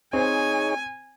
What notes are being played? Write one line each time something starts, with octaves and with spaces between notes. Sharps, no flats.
C4 D#4 G#4 C5 C#5 G#5